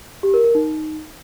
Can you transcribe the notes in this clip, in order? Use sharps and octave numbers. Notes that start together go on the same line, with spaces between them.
G4
A#4
A#4
D#4